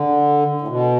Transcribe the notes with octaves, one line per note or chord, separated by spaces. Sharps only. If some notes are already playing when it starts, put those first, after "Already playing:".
Already playing: D3
A2
B2